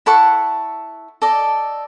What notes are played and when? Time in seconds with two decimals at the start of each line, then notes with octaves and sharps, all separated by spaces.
0.06 E4 A4 F#5 C#6
1.22 A4 D5 D#5